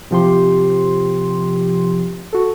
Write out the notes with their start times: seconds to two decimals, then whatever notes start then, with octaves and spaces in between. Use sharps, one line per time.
0.11 C3 F3 G4 C6
2.33 F#4 A4